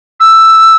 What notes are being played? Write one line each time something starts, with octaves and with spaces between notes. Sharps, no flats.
E6